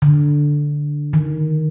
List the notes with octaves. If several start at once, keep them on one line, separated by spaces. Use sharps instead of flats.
D3
D#3